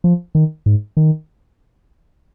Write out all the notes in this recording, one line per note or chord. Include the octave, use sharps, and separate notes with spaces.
F3
D#3
G#2
D#3